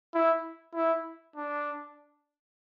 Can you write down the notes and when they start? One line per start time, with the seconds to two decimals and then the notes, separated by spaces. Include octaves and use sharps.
0.14 E4
0.75 E4
1.36 D4